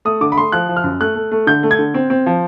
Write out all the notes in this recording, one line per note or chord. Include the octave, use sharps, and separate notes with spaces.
A3 D#6
D3 D6
B5
A3 C6
F3 F#6
F3
F6
F#2
A3 F#6
A3
A3
D3 G6
A3
G#6
D3
C4
C4
F3